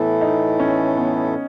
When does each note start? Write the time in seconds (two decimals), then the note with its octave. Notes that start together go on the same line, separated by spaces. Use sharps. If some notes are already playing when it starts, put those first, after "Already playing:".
Already playing: A2 E3 A3 B3 E4 A4
0.21 D#4
0.59 C#4
0.97 B3